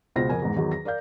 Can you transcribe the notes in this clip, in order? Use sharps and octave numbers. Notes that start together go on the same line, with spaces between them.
C#2 B2 F4 F#4 C5 A#6
F2 A#4 G#5
E2 G#2
E2 D#3 F#3
A#6
A#4 D5 F5 G6